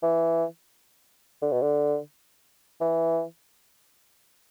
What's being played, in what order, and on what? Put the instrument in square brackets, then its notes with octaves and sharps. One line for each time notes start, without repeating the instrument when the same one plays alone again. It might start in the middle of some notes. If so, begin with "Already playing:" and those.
[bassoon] E3
D3
B2
D3
E3